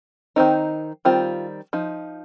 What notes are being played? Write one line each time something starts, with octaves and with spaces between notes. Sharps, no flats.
D#3 C4 D#4
D#3 G3 C4 F4
F3 D#4